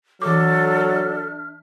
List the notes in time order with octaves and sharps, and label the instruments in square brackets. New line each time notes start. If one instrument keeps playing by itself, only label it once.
[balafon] E3 D6 [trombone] F#3 [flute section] D4 E5 F6 [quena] A4